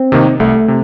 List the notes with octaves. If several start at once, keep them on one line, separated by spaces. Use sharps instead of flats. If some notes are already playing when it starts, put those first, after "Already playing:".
Already playing: C4
C3 D#3 A#3 D#4
C2 A3
C3